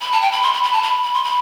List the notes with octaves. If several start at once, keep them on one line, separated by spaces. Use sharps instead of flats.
B5
A5
G5
B5
C6
B5
B5
A5
B5
B5
C6
B5